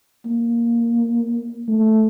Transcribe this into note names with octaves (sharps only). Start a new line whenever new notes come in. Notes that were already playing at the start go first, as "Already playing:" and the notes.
A#3
A3